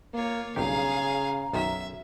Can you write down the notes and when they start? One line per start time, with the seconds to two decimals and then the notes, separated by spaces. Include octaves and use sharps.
0.13 A#3 F4 C#5
0.56 B1 G2 C#3 G4 G#4 F5 A#5
1.53 B1 F#2 D#3 E5